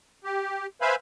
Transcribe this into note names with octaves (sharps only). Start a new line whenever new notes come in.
G4
B4 C5 E5 F5 G#5 B5